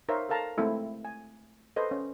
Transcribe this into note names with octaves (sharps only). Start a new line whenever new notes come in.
D#4 A#4 C5 C#5 E5 F5
A4 A#4 F5 A5 A#5
G#3 A3 C4 E4 A4
G#5
A4 B4 C5 D#5
C#4